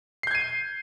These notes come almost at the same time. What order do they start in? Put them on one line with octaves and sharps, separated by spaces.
C7 G6 G#6 D#7